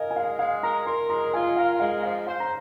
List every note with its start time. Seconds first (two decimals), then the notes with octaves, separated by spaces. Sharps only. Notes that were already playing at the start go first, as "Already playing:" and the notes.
Already playing: A#4 D#5 F5 G#5
0.11 G#5
0.16 G#3 F5
0.39 G#3 F5
0.63 A#4 A#5
0.86 A#4 C6
1.10 G#3 A#5
1.33 F4 G#5
1.56 A#4 F5
1.80 G#3 F5
2.03 F3 F5
2.26 C5 F5
2.40 A#5